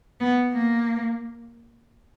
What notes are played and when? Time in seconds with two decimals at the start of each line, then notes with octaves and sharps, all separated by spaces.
0.20 B3
0.52 A#3